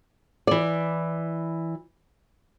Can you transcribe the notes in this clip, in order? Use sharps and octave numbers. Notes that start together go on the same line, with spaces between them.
E3 D5